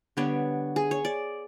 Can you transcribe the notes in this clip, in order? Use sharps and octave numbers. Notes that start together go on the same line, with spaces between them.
D3 G3 B3 D4 C#5
G#4
C#5
D5